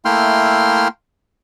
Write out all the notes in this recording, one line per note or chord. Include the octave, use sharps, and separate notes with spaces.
A3 A#3 E4 G5 C6 F6